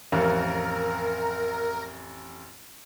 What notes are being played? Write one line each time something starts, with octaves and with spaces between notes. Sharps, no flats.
A1 F2 A#4